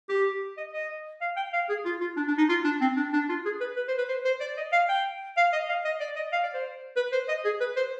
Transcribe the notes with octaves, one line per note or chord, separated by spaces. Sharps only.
G4
D#5
D#5
F5
G5
F5
G#4
F4
F4
D4
D4
D#4
F4
D4
C4
D4
D4
F4
G#4
B4
B4
C5
B4
C5
C5
D5
D#5
F5
G5
F5
D#5
F5
D#5
D5
D#5
F5
D5
C5
B4
C5
D#5
G#4
B4
C5